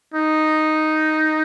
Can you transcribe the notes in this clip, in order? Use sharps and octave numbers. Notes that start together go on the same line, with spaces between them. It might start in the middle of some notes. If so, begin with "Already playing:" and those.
D#4